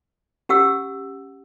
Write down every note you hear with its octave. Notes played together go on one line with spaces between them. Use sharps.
C#4 G4 F#5 E6